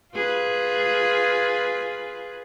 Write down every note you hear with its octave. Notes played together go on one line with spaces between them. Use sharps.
F4 G#4 B4